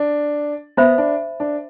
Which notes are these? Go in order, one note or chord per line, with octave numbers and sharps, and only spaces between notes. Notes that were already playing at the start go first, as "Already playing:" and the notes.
Already playing: D4
B3 C5 E5 B5
D4
D4